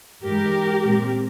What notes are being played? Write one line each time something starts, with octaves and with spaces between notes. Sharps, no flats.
G#2 E3 G#3 G4 A#4
A#2 G#3 C4